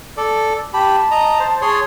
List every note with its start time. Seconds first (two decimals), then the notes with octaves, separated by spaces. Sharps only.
0.17 A4 D5
0.74 G4 A5 B5
1.11 D#5 A#5
1.40 C5
1.61 G#4 C#5 C6